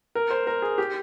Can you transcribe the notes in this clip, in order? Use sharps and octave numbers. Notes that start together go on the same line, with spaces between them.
A#4
C5
A#4
G#4
G4